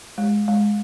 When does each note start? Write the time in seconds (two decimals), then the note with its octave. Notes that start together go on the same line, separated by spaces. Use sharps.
0.18 G#3
0.48 G#3